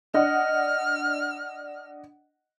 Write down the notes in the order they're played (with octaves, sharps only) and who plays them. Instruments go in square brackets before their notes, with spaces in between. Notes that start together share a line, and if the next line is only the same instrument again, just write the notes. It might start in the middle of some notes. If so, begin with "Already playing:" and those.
[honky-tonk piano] D4 D#5 F#5 [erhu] F6